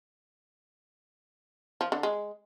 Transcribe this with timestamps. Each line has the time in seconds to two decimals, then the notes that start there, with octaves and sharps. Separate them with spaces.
1.81 F3
1.92 D3
2.03 G#3